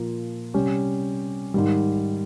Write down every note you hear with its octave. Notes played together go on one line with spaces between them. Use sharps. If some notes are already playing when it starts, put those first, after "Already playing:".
Already playing: A#2 F3 A#3
C3 G3 C#4 G4
G#2 D#3 G3